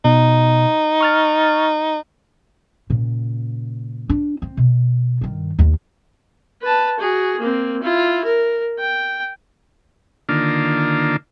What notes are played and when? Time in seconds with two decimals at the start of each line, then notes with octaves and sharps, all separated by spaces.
0.05 B2 D#4
1.01 C#6 F6 A6
2.90 A#2 C#3
4.09 D4
4.42 C4
4.57 B2
5.21 G2 D#3
5.59 D#2 D#3
6.62 B4 A5
6.99 F#4 G#4
7.40 A#3 C4
7.83 E4 F4
8.24 A#4
8.79 G5
10.29 D3 D#3 A#3 D4 F4